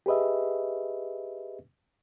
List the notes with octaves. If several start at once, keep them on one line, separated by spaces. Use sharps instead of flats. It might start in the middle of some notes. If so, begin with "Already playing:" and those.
G4 G#4 B4 D#5 E5